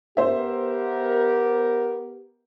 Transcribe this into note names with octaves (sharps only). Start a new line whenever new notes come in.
B3 G4 A#4 C5 E5